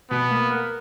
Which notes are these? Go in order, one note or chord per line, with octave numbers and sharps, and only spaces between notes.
B2 B3
A#3
A#4